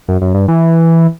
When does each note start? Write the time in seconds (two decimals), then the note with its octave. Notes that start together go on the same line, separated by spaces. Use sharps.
0.08 F#2
0.21 F#2
0.34 G2
0.48 E3